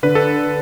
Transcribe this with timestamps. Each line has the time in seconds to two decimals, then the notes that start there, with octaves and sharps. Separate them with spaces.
0.03 D3 B4
0.15 A4